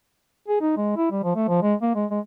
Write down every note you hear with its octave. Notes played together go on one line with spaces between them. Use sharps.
G#4
D#4
G#3
E4
G3
F3
A3
F3
G#3
A#3
G#3
G#3